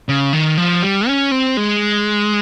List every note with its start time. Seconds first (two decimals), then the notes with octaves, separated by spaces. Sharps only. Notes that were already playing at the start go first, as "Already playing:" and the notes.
0.09 C#3
0.33 D#3
0.57 F3
0.83 G3
1.08 C#4
1.32 C4
1.57 G#3